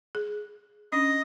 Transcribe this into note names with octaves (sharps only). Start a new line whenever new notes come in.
G#4
C#4 D4 D#5 D#6